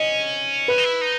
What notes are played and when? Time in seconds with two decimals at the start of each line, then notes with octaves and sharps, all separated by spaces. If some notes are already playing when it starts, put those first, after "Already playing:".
Already playing: C#4 D#5
0.68 B4
0.78 D#4
0.84 E4
1.01 D#4